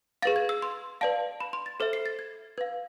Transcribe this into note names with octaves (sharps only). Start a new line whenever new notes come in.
G#4 B4 F5 A6
G#6
E6
C6
B4 D5 F5 A5
B5
C6
A6
A4 C5 E5
C7
A6
G#6
B4 F5 G#6